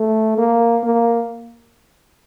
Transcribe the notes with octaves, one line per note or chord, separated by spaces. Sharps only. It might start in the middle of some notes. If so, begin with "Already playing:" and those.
Already playing: A3
A#3
A#3